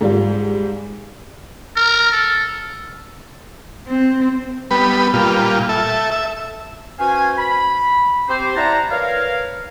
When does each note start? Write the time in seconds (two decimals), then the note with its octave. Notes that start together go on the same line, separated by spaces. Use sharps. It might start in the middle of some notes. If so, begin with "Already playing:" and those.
0.01 G#2 G3 F4
1.76 A#4
2.12 A4
3.87 C4
4.71 G3 B3 B4
5.14 A#2 G3 F4
5.69 A4 E5
6.12 E5
6.99 C#4 F#4 B4 C5 F5 G#5
7.38 B5
8.29 C4 G4 C5
8.56 E4 D5 E5 F#5 A5 A#5
8.90 A#4 B4 C#5 D5 F5